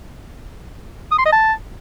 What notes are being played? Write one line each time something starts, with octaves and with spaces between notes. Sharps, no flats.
D#6
C6
D#5
A5